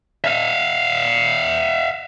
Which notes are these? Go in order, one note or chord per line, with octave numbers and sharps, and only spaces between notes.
E5 F5